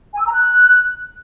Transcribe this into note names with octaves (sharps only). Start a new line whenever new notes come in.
G#5
E6
A#5
F#6